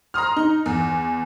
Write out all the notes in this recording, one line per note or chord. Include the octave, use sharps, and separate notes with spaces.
A#5 C6 D#6 F6
D#4
E2